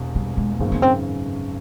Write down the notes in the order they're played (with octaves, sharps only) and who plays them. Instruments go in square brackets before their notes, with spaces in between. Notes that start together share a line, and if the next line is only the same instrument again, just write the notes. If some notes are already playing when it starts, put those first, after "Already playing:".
Already playing: [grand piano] E1 E2 C3
[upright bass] G3
G#3
[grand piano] G#1 F#2 C#3 [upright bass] A#3
[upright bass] B3
C4